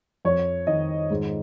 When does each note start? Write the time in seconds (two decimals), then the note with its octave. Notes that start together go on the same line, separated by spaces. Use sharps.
0.25 F2 C#5
0.67 D#3 D#5
1.11 G#2